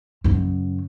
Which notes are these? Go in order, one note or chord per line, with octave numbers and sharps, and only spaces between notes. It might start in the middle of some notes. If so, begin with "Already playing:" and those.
F#2 C#3